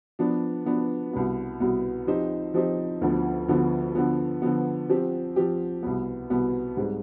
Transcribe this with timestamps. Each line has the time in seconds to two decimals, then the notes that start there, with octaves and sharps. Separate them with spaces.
0.19 F3 B3 D4
0.66 F3 B3 D4
1.13 C2 B2 B3
1.60 C2 B2 B3
2.07 F3 C4 D#4 G4 C5
2.54 F3 C4 D#4 G4 C5
3.01 D2 D3 F3 B3
3.48 D2 D3 F3 B3
3.95 D3 F3 B3
4.42 D3 F3 B3
4.89 F3 C4 G4
5.36 F3 C4 G4
5.83 C2 B2 B3
6.30 C2 B2 B3
6.77 G#2 G3 C4